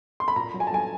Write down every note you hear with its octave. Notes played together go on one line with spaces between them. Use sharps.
C6
B5
A#2 A#5
F#3
G#5
A5
F#3 G#5